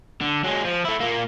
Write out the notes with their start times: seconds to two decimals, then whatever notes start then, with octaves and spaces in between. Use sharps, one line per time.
0.21 D3
0.44 F#3 G#3
0.65 F3
0.85 A3 E4
1.00 A#2 A#3